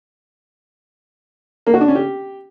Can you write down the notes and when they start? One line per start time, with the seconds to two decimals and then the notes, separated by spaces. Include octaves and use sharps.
1.67 A#3
1.74 F#4
1.81 D4
1.88 C#4
1.95 G4